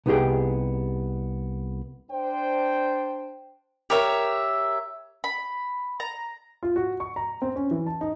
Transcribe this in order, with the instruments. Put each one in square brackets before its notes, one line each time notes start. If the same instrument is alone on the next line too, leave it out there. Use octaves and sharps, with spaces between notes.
[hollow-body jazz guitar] C2 B3 D#4 G4 G#4 G5
[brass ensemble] D4 C5 G5
[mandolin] G4 A#4 C#5 E5
B5
A#5
[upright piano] F4
F#4
C#6
A#5
C4
C#4
E3
A5
D#4